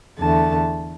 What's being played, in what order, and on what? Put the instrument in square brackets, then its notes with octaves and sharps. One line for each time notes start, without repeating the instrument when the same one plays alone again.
[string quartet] E2 D3 A3 A5